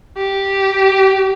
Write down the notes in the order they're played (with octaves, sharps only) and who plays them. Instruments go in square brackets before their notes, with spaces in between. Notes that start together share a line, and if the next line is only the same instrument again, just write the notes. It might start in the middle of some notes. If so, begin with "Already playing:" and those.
[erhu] G4